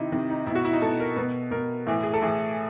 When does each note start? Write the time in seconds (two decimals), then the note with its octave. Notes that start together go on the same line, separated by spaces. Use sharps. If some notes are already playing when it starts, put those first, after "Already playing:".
Already playing: C3 D#3 D#4 E4
0.12 C3 D#3
0.30 D#4
0.46 B2 E4
0.55 F#4
0.65 E4
0.73 D#4
0.82 B2 A4
1.00 A#4
1.16 B2 B4
1.51 B2 A#4
1.87 A2 E3
2.03 G#4
2.14 A4
2.22 A2 E3 G#4